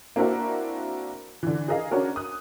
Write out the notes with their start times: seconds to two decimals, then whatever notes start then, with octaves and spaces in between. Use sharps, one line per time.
0.16 A#3 C4 D4 E4 F#4 A#4
1.43 D3 E3
1.68 G#4 A#4 D#5 F5
1.91 C#4 D4 F#4 A#4
2.16 D#6 F#6